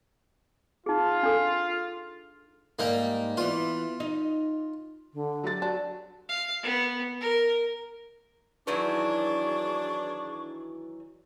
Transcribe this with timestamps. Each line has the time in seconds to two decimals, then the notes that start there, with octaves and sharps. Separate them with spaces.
0.86 D#4 F4 G#4
1.23 D4 A4
2.79 G#2 G3 A#3 D#4 A#4
3.37 E3 B3 F4
4.00 D#4
5.14 D3
5.44 F#3 G4 A6
5.62 D4 F#4
6.29 F5
6.63 B3
7.21 A#4
8.67 D#3 E3 F#3 D4 G#4 B4 C#6 D6